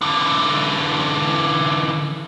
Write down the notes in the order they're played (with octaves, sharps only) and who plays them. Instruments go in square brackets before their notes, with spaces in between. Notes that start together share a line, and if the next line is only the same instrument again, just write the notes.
[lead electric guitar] D3 E3